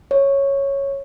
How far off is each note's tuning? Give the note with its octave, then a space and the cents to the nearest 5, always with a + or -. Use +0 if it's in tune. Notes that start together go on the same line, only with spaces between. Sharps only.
C#5 -5